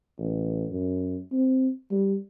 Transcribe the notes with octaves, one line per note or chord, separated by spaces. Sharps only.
A1
F#2
C4
G3